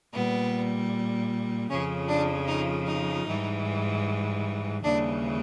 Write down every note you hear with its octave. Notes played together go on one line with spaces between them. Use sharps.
A#2 G3 B3
F2 C#3 F3 C#4
D4
D#4
D#4
G#2 E3 G3
D#2 C#3 E3 G3 D4